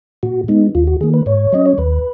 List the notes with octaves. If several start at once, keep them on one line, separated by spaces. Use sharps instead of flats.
A#2 F#4
G#3 B3 D#4
D#2 F4
F#4
D#3 A#3 G#4
B4
G#2 C#5
F#3 C#4 D#5
C#5
D#2 B4